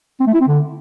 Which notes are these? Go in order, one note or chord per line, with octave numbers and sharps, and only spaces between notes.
C4
A3
E4
C4
D3